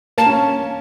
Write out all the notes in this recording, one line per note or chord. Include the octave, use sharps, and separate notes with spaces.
A#3 A5
C#4